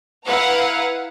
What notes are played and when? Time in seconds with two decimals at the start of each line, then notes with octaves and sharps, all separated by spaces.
0.25 E4 B4 F5 F#5 A#5